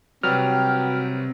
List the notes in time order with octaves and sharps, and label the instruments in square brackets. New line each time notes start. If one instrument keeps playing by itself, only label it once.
[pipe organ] C3 [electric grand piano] F#3 G3 [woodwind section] F#4 B4 G5 [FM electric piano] F6